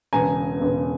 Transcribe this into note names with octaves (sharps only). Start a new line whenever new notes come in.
E1 E2 C#3 G#5 A#5
E1 E2 C#3